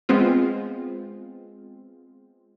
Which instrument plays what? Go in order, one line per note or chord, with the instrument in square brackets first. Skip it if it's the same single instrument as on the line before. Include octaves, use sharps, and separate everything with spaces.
[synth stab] G#3 B3 C4 F4